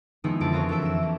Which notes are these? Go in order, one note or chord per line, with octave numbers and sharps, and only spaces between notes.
D#3 F3 G#3 B3 D#4 E4
F2 D3 G#4 B4 A5 D7
C4 F4 F#4 A#4 C#5
E1 E3 A4 E5 D7
F2 E7
A#3